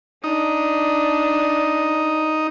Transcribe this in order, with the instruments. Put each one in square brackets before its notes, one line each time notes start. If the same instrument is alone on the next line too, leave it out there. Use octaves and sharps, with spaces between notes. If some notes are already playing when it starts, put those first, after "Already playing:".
[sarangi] D4 [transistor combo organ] D#4